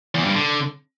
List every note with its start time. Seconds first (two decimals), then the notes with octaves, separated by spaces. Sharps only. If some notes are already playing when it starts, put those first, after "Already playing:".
0.15 E2
0.25 G2
0.35 D3